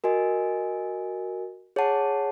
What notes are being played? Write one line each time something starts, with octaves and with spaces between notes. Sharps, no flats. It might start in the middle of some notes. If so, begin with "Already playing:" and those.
F#4 A#4 D#5 G#5
G#4 C#5 F#5 A5